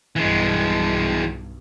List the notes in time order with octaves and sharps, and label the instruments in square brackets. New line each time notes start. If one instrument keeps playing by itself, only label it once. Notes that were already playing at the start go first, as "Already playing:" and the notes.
[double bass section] B1 G2 [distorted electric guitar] E3 G#3